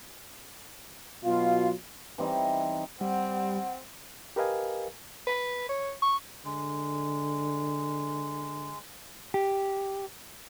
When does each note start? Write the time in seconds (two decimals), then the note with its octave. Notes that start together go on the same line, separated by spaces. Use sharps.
1.24 B2 F#3 F4 F5
2.18 E3 G3 C4 D#4
3.01 G3 C4 F#5
4.36 G4 A#4 B4 D#5 F5 G#5
5.27 B4
5.69 C#5
6.02 C#6
6.45 D3 G#3
9.34 G4